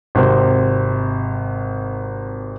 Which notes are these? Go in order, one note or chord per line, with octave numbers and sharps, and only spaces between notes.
G#1 C3 C5